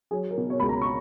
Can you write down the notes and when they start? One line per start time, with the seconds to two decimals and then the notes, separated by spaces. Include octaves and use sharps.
0.11 F#3 G#4
0.31 A#4
0.38 B2
0.50 C#5
0.60 C#2 B5
0.69 A#5
0.82 C#6